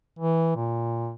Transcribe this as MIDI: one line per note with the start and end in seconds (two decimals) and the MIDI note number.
0.19 0.55 52
0.56 1.14 46